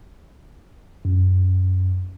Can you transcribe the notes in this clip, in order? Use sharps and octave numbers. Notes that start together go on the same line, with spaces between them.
F#2